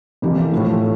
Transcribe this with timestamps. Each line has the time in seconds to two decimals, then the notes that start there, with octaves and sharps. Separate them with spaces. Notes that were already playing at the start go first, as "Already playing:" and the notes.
0.22 F2 E3 A#3 E4 G4
0.52 A2 F3 A3